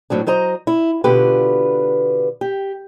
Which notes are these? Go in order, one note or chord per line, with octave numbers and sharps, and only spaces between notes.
A2 F#3 C4 D4
F#3 C5 D#5 A#5
E4
B2 D3 B3 F4 G4 B4
G4